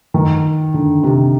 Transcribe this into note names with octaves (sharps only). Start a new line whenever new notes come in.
D#3
D3
C3